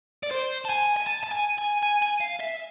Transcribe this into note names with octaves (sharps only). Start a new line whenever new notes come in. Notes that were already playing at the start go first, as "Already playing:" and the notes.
D5
C5
A5
G#5
G#5
A5
A5
G#5
G#5
G#5
G#5
F5
E5